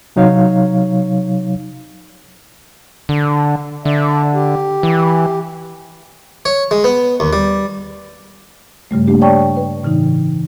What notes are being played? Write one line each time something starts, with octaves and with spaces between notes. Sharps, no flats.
C3 F#3 D#4 C#5 F5
D3
D3 D5 E5
G4
E3
C#5
G#3
B3
D#2
G3
G2 C#3 G3 A3
A3 A#3 D4 G4
C#5 D5 G5 A5 C#6
B4
A2 C#3 E3 D#4